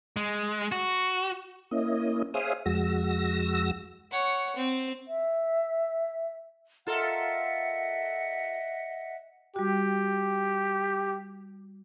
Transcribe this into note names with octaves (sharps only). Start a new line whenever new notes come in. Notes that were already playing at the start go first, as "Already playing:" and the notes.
G#3
F#4
A#3 C#4 E4 D#5
G#4 C5 C#5 E5 F5 D#6
F2 G#3 F#4 E6 A#6
C#5 F#5
C4
E5
F4 A4 A#4 D#5 E5 F#5
G3 F#4 G4